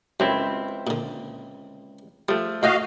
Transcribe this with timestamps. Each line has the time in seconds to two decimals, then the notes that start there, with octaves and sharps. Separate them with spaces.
0.20 C#2 F#2 C4 E4
0.87 A#2 D3
2.28 F3 G3 A3
2.63 A2 F#4 D#5 F5 G5 G#5